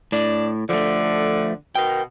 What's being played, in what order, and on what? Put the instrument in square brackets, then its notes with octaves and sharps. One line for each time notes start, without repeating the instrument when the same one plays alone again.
[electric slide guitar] A2 [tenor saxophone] D4
[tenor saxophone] D3 [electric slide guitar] F3 A3
[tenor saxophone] B2 [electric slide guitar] A#4 G5